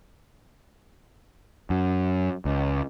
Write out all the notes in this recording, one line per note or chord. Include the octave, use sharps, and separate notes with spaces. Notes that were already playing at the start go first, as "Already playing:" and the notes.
F#2
C#2